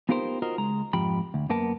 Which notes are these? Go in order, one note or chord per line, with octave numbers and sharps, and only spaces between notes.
B3 D#4 F4 G4 A#4 C5
F4 F#4 A#4 C5 D#5
C#2 G#3 A#5
F2 G#2 F3 G4 B5
D2
F#2 A#3 B3 A#4 A5